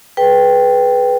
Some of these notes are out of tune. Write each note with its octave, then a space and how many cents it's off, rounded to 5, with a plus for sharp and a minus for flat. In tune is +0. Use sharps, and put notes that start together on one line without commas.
G#4 +35 B4 +0 G5 +0